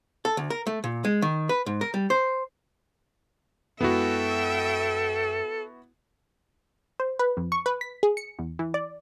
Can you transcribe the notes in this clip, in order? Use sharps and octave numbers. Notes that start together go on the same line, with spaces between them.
A4
D2
A#4
A3
A#2
G#3
D#3
B4
G#2
A#4
G3
C5
F#2 G#3 B3 E4 F#4 A4 E5 G5
C5
B4
F2
C#6
B4
B6
G#4
C#7
E2
E3
D5